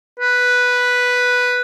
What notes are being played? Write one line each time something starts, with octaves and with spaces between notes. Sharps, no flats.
B4